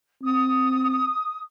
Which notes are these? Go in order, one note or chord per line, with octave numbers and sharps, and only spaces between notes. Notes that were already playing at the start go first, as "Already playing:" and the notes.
C4 D#6